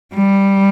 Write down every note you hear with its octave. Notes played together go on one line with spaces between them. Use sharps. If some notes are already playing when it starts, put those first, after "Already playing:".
G3